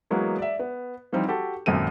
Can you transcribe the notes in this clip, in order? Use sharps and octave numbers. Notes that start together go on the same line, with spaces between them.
E3 F#3 G#3 A#3 B3 F#4
D5 E5
B3
E3 F3 G3 C4 D#4
F#4 G4 A4
G#1 F#2 A#2 C4 A4 D#7